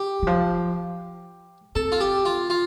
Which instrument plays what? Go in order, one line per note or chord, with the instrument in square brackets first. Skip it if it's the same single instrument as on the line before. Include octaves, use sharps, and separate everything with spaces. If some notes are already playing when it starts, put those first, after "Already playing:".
Already playing: [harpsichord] G4
[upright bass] E3
F3
[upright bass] C4 [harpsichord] A4
[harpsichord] F4
G4
F4
F4